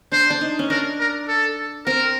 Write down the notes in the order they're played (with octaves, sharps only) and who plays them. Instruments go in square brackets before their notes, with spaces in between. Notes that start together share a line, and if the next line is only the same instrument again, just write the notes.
[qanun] D4 [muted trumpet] C5
[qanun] D4
D#4
C#4
[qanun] D4 [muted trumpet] A#4
[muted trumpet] A#4
A4
[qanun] C4 [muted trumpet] A#4